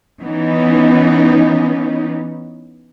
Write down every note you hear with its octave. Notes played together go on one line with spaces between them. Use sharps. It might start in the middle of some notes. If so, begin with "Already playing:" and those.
E3 B3 C#4 D#4